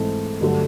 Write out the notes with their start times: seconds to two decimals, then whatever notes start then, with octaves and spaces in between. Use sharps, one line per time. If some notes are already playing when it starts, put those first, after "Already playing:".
Already playing: G#2 E3 A3 C4
0.41 G2 D3 F#3 A3